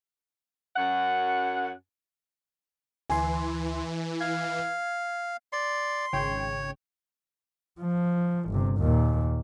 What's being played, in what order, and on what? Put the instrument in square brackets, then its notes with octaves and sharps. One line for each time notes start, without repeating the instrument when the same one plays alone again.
[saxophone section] F#2 F#5
[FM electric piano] D2 C6 [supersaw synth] E3 [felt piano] G#5
[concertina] F5 [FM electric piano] G#6
[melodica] D5 [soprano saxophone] C6
[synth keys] G#1 C#3 G5 [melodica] C#5
[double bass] F3
G1 C3
D#2 A#2